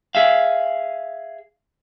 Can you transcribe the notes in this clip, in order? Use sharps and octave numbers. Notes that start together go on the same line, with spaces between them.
G#4 E5 F5